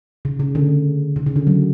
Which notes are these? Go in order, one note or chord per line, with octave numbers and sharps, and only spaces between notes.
C#3
C#3
D3
C#3
C#3
D3
F#3